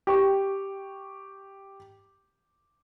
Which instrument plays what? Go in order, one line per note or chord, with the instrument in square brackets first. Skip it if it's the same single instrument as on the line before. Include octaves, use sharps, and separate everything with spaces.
[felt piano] G4 C#6